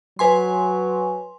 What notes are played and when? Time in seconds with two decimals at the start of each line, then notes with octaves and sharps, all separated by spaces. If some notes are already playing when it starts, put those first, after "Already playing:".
0.19 F#3 B4 G#5 C6